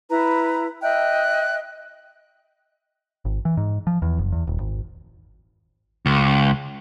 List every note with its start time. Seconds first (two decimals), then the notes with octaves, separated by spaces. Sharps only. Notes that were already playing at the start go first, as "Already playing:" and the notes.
0.09 E4 B4 A#5
0.81 D#5 E5 G5 F#6
3.25 G#1
3.45 E3
3.57 G#2
3.87 F3
4.02 E2
4.18 F#1
4.32 E2
4.47 D#1
4.60 G#1
6.06 C#2